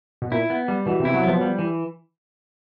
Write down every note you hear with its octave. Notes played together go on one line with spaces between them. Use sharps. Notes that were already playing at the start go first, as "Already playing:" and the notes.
B2
A#2 E4
B3
G3
B2 E3
C3
E4
F#3
F3 B3
G3
E3